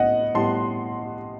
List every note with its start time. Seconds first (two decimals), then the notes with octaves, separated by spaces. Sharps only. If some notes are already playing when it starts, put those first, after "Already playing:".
Already playing: A2 B3 D#5 F#5
0.34 A2 G3 B3 A5 C6